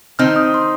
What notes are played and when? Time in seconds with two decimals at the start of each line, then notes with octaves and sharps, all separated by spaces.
0.19 D#3 C4 D#4 F6
0.36 D#6
0.54 C6